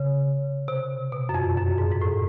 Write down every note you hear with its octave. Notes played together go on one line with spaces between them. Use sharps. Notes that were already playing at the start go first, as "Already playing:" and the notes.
Already playing: C#3
C3
B2
F#2
F2
F#2
G#2
G#2
A2